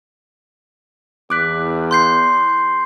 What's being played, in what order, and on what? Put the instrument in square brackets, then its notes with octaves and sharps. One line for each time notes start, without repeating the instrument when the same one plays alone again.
[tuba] E2 [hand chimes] D6 F#6 B6
[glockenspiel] C6 G6 C7